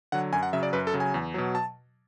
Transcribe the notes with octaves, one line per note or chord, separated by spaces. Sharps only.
D3 F#3 F#5
F#2 G#5
F#5
C#3 F#3 E5
D5
F#2 B4
A4
C#3 F#3
G#5
E2
B2 F#3
A5